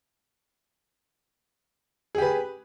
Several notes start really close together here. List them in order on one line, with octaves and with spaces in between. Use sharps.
G#4 G4 B4